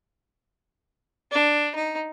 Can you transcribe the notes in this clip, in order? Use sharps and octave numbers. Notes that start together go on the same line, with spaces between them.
D4
D#4